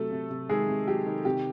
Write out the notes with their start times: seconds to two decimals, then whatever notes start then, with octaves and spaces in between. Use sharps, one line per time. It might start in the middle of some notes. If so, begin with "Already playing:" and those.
Already playing: C3 F#3 A3 A4
0.11 C3
0.30 C3
0.49 D#3 G#3 G#4
0.68 C3
0.87 F#3 G4
1.06 D#3
1.25 C3 G4